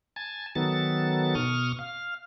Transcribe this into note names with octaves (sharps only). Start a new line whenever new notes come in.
G#5 A5
D#3 F#3 B3 A4 A6
B2 C#6 D#6 F6
F5